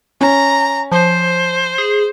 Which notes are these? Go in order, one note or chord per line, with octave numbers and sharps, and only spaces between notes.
C#4 A#5
F3 C5
G#4